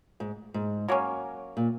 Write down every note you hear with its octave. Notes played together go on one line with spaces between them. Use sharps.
G#2
G#2
F#3 A#3 C#4
A#2